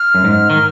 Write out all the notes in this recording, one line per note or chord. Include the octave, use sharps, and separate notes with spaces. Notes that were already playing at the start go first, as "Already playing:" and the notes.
Already playing: F6
F#2
G#2
D#3